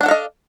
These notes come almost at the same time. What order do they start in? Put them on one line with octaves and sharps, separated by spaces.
D4 F#5 A4 F5 D#5